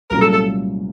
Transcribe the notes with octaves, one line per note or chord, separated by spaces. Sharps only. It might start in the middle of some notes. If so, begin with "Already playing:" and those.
C2 A#2 F#3 A3 C#4 A#4
A4
A4